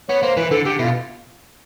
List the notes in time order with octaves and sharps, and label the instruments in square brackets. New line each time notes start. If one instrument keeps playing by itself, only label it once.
[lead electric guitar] B3 [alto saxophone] C#5
[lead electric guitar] A#3 [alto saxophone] C5
[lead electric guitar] E3 [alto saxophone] B4
[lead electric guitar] D3 [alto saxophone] A4
[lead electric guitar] D3 [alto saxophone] G4
[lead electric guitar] B2 [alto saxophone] E4
[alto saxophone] F4